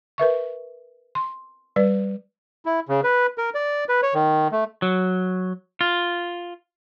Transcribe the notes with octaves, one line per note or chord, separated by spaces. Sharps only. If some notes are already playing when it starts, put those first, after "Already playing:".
A#4 B4 E5 C#6
C6
G3 B4 D5
E4
C#3
B4
A#4
D5
B4
C#5
D#3
A3
F#3
F4